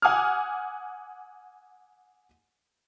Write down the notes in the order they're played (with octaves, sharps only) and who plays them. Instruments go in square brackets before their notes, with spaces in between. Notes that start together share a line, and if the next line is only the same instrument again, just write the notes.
[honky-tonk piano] F#5 G#5 D6 D#6 F6